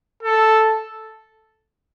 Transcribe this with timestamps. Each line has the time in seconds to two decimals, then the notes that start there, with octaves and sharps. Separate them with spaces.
0.23 A4